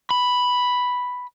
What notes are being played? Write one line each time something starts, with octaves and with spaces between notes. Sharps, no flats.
B5